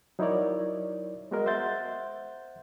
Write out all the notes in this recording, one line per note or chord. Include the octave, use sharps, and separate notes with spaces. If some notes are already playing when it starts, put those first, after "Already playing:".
F#3 D#4 E4 A#4 C#5 D5
G#3 B3 F#4 G#4 A#4 D#5
C5 E5 F#5 C6 G6 A6